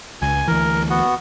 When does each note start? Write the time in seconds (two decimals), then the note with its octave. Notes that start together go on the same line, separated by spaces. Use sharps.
0.22 C#2 G#5
0.48 D2 E3 A#4
0.90 B3 F#4